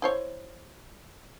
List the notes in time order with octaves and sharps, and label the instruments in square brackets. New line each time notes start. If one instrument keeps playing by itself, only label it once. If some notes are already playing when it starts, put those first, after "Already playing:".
[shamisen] E4 C5 C#5